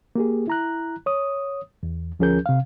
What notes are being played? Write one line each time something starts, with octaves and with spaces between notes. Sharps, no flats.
A#3 G4 G#4
E4 A#5 F#6
C#5 D#6
E2
D2 F3 C#4 G#4 A#4 G6
C3 F5